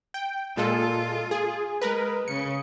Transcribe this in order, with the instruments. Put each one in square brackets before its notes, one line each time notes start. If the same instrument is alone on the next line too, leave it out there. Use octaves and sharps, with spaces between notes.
[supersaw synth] G5
[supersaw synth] A#2 G#3 A4 [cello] F4
[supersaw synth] G#4
[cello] G#3 [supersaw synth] A#4 B4
[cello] C#3 [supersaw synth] C#7